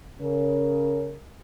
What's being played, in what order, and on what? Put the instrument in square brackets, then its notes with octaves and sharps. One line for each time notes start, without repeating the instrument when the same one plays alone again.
[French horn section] C#3 C#4 A#4